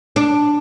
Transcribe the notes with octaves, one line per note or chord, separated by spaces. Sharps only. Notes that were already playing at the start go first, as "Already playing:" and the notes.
D4